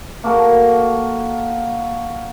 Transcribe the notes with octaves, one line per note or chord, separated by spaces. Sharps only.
A#3 F#4 A4